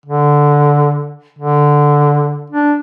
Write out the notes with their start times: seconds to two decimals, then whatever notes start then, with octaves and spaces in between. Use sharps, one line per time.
0.06 D3
1.39 D3
2.50 D4